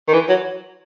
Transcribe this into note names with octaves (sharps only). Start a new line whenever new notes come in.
D#3
E3
F#3